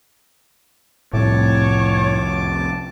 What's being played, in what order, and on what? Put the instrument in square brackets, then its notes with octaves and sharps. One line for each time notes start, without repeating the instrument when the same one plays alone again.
[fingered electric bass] C2 F2 [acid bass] A2 [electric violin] C#5 [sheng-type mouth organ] A5 D6